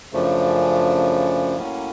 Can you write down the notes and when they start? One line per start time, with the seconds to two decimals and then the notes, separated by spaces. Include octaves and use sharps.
0.12 F#2 C#3 F3 A3 D4
1.57 A2 F#3 A#3 C#4